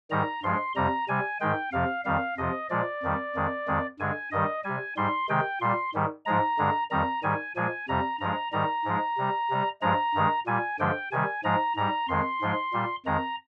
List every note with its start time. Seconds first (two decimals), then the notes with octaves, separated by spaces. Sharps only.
0.11 G#2 D#3 G3 A#5
0.43 G2 F3 G#3 C6
0.76 F2 C3 G3 A#5
1.08 C3 G3 G#5
1.40 G#2 D#3 G#3 G5
1.72 F2 C3 F3 F5
2.05 F2 D#3 G3 F5
2.37 F2 C3 F3 D#5
2.70 A#2 F3 G#3 D5
3.03 F2 D#3 G3
3.35 F2 D#3 G#3
3.67 F2 D#3 G#3
3.99 G2 D3 G#3 G#5
4.32 G2 D#3 G3 D#5
4.64 C3 G3 G#5
4.97 G#2 G3 C6
5.29 C3 D#3 G#3 G5
5.61 A#2 G3 C6
5.94 G#2 D#3 G3
6.26 G#2 F3 G#3 A#5
6.59 G2 D3 G#3
6.91 F2 D#3 G3 A#5
7.23 G#2 D#3 G3 G#5
7.56 A#2 F3 G#3 G#5
7.88 F2 C3 G3 A#5
8.20 G2 F3 G#3 A#5
8.52 G#2 D#3 G3 A#5
8.85 G#2 F3 G#3
9.18 C3 G3
9.50 C3 G3
9.82 G2 F3 G#3 A#5
10.15 G2 D#3 G#3
10.46 A#2 G3 G#5
10.79 G2 D3 F3 G#3 G5
11.12 C3 D#3 G3 G#5
11.44 G#2 F3 G#3 A#5
11.76 G#2 G3 A#5
12.08 F2 D#3 G#3 C6
12.41 G#2 F3 G#3
12.73 A#2 G3
13.06 F2 D#3 G#3 A#5